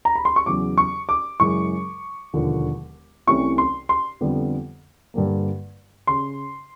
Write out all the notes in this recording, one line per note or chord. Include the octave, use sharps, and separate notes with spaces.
A#5
B5
C6
C#6
E2 C#3 F#3 D6
C#6
D6
F#2 C#3 E3 G#3 C#6
E1 D#2 D3 F3
C2 C3 E3 A3 C#4 C#6
C6
C6
F2 D3 G3 B3
G2 D3 G3 A#3
C#3 C6